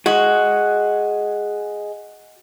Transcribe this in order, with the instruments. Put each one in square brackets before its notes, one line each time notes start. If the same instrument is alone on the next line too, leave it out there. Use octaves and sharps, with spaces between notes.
[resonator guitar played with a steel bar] F#4 [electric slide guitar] G#4 D#5